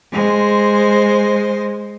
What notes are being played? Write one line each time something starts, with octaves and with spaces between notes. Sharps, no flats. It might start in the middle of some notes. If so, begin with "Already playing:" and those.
G#3 C5